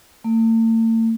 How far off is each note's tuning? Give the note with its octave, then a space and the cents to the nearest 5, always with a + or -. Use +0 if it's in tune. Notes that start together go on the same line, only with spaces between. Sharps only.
A3 +45